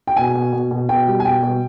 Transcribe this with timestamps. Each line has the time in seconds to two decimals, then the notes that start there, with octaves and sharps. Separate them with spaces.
0.07 G5
0.17 B2 G#5
0.35 B2
0.53 B2
0.71 B2
0.89 B2 G5
1.08 G3
1.20 G#5
1.25 B2 G5
1.43 B2